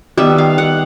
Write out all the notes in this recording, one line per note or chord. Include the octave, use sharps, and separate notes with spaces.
D#3 G3 B3 E5
F5
F#5